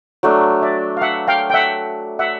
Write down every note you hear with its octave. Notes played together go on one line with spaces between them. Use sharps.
F#3 A3 D4
D5 E5
F5
E5 F#5
F5 G5
G5
E5 F#5
E5 F#5